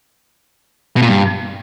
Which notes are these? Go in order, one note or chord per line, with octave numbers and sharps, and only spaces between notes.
B2
A#2
G2